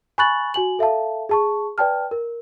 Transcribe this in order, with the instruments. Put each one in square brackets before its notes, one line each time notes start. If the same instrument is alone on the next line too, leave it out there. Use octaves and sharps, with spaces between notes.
[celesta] G#5 B5 C#6 F#6 A6 F#7
F#4 G#5 F#7
A4 E5 F5 A5
G#4 A5 C#6
B4 D5 G5 A5 F6
A#4